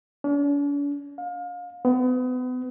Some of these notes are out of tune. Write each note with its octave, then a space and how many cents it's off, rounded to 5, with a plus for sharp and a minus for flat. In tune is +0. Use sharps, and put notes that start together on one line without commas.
D4 -45
F5 +30
B3 +35